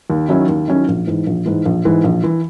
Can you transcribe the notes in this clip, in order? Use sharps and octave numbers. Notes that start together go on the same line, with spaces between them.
D#2
D#3 F#3 C#4 E4
D#2
D#3 F#3 C#4 E4
A#1
G#2 E3
A#1
G#2 E3
A#1
G#2 E3
A#1
E3